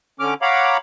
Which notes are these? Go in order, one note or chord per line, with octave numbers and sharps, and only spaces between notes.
D3 C#4 D6 F6
C#5 F5 F#5 A#5 B5 D6